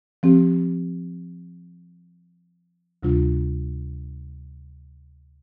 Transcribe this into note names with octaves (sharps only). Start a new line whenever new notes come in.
F3 C4 G4
D2 C3 G3 D4 F4